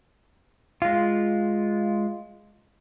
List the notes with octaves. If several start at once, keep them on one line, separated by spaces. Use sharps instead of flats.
G#3 F4